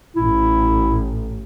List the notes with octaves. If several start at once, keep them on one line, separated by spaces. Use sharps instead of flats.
A1 E4